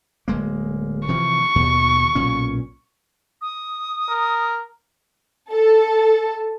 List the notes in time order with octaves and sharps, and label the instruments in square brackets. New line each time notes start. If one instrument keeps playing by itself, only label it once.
[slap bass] D1 G#3 A#3
[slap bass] C3 E3 F3 [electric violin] C#6
[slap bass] D#2 B2
B1 A#2 C#4
[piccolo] D#6
[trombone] A#4
[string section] A4